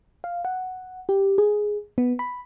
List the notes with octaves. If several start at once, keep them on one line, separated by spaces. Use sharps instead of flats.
F5
F#5
G4
G#4
B3
B5